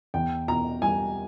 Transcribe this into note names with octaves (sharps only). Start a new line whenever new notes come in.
E2 G5
B2 A#5
G3 G#5